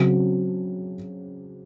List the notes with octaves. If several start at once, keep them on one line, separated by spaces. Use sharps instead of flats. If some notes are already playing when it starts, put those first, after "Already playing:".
Already playing: C#3 F#3 C4